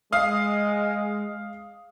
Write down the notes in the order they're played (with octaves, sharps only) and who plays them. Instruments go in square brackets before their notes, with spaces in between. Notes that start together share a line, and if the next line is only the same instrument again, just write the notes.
[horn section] G#3 [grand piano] F5 D#6